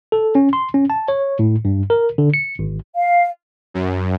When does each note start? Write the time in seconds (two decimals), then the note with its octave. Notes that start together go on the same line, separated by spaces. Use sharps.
0.12 A4
0.35 C#4
0.53 C6
0.74 C#4
0.90 A5
1.08 C#5
1.39 A2
1.65 G2
1.90 A#4
2.18 D3
2.34 C#7
2.59 G#1
2.95 F5
3.74 F#2